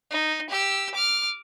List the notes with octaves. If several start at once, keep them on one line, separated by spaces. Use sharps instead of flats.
D#4
G4 E6
D6 F6